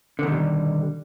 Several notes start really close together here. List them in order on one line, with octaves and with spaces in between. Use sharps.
D3 D#3 B2 G3